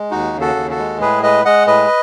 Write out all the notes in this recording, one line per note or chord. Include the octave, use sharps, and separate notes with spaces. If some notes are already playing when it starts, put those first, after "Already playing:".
Already playing: G#3
D#2 D#4 F#4
C#3
F#4 A4
D#2
F#4 A4
G#3
A2 G#4 B4
G#3 B4 D#5
G#3 D#5 F#5
A2 B4 D#5